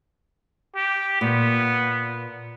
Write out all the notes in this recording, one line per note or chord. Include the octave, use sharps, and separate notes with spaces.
G4
A#2 B3